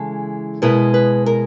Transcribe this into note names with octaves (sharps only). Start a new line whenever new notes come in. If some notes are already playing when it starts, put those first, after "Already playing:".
Already playing: C#3 E3 G#3 A4
B2 G#3 B3 E4 A#4
B4
A#4